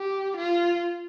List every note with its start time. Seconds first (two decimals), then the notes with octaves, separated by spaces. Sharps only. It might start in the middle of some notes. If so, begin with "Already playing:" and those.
Already playing: G4
0.37 F4